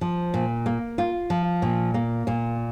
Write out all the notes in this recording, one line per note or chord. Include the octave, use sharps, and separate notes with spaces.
F3
A#2
A#3
F4
F3
A#2
A#3
A#2